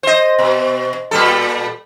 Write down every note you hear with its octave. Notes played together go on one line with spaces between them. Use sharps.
C5 D#5
B2
A#2 G3 A4